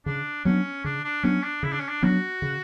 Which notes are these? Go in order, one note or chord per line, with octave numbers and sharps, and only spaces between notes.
C#3 D4
F#3 B3 C#4 D4
C#3 D4
D4
F#3 B3 C#4 D4
D4
C#3 E4
D4
C#4
D4
F#3 B3 D4 F#4
C#3